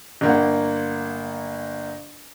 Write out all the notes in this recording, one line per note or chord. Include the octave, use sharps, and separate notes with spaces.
G1 A#3 F#5